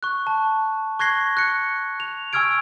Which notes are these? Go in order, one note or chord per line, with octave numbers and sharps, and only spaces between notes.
C#6 F#6
A5
C#6 F#6 G#6 A#6 C7 G7
F#6 C#7
F7
G#5 C#6 E6 F6 G#6 D7